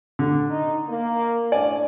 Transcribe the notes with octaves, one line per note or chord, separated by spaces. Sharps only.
D3
D#4
A#3
A2 C#4 D4 D5 G#5